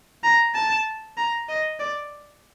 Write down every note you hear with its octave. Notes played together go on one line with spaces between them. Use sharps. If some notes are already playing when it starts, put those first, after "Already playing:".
A#5
A5
A#5
D#5
D5